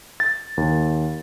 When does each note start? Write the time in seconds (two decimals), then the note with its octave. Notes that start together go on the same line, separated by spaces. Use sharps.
0.20 A6
0.57 D#2